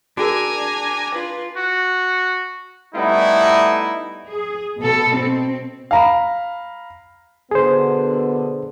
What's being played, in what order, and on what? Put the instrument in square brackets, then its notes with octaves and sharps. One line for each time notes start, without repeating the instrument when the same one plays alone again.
[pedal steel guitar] D4 [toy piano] F#4 G#4 A#4 [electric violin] G#5 A#5
[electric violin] F4 B4
[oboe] F#4
[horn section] G3 A3 B3 D#4 E4
[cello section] G#4
B2 A4
C4
[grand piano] F5 A#5 B5
[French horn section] B2 D3 B3 [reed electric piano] G#4 C5